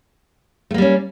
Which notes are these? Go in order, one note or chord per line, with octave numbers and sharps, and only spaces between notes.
G3 A3 A#3 C#4